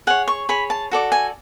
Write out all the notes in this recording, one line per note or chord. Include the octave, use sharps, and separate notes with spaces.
G#4 C#5 F#5
C#6
G#4 C#5 B5
A5
F#4 A4 D5
G#5